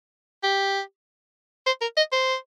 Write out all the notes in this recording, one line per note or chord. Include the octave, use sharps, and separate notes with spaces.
G4
C5
A#4
D#5
C5